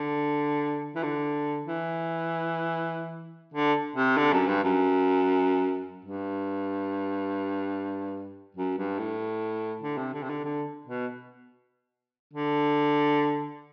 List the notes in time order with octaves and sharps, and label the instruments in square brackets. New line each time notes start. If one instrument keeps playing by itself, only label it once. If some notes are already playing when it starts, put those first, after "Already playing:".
Already playing: [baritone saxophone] D3
E3
D3
E3
D3
C3
D3
F#2
G2
F#2
G2
F#2
G2
A2
D3
C3
D3
C3
D3
D3
B2
D3